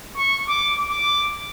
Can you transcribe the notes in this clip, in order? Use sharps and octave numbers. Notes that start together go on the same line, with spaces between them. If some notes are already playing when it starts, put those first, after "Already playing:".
C#6
D6
D6